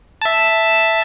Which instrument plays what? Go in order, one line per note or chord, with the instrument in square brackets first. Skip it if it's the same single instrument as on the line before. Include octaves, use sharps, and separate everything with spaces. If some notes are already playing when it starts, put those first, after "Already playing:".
[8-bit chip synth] E5 A5